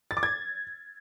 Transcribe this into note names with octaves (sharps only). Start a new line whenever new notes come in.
A6
D6
G#6